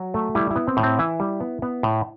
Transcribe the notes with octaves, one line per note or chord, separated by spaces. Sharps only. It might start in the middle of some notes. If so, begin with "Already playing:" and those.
Already playing: F#3 F#4
A3
G3 E4
E4
B3
C4
A2
C4
E3 E4
G3
B3
B3
A2